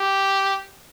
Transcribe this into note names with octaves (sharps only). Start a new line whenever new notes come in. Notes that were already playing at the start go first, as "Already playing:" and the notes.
Already playing: G4